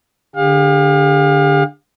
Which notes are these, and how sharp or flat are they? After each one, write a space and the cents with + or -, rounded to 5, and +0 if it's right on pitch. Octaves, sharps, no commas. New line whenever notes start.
D3 +0 G4 +40 F5 +30